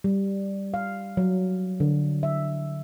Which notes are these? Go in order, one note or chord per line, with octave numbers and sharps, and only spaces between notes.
G3
F5
F#3
D3
E5